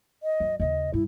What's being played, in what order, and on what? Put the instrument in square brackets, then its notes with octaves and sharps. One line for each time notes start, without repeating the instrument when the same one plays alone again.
[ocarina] D#5
[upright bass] F#2
[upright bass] D#2 C#3 [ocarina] D#5
[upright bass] G2 [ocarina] E4